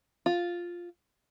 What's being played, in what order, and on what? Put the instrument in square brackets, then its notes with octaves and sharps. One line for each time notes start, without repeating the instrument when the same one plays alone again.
[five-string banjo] F4